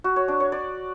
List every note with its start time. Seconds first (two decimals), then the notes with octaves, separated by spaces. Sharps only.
0.04 F#4
0.16 C#5
0.28 D4
0.40 C#5
0.52 D5